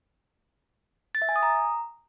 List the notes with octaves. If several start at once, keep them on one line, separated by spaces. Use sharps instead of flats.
A6
E5
G#5
D#6
A#5